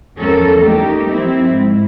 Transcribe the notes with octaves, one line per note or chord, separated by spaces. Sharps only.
E2 F3 C#4 A4 A#4
G3 A3 A#3 D#4 G4
F3 C4 E4
G#2